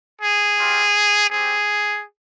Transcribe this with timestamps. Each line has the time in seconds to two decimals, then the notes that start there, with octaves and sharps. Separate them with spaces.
0.22 G#4
0.58 G3 C4 F4
1.30 C4 G4 G#4